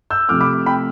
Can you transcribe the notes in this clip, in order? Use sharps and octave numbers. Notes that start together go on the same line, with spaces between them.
E6 G6
C3 F3 A3 D6 F6
B5 D6
G5 B5